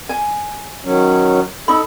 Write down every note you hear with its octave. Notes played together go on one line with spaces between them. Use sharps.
G#5
D#3 F#3 C#4
D#4 A4 B5